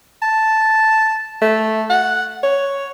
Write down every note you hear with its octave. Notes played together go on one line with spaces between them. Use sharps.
A5
A3
F#5
C#5